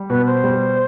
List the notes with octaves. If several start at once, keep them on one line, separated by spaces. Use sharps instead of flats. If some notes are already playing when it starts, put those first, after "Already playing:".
Already playing: G3
B2 B4
C5
G3